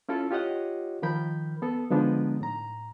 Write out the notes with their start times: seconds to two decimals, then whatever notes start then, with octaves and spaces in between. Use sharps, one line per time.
0.09 C#4 E4 F4 A4
0.31 F4 G4 C#5 D#5 F#5
1.02 D#3 F3 A#4 B5 G6
1.62 B3 A4
1.90 D3 F3 G#3 B3 D4 D#4
2.41 A2 A#5